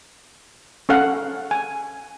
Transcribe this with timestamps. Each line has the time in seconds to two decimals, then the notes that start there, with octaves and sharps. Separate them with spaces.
0.89 C#4 A4 F5 F#5
1.51 G#5